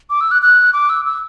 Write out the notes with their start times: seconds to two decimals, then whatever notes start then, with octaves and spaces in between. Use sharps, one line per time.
0.10 D6
0.21 E6
0.31 F#6
0.42 F#6
0.73 D6
0.89 E6
1.05 E6